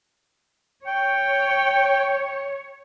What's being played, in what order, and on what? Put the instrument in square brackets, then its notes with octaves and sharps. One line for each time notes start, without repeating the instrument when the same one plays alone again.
[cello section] C#5 [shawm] G5